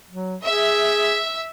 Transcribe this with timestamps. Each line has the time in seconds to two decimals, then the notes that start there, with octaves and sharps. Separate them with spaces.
0.11 F#3
0.43 G#4 E5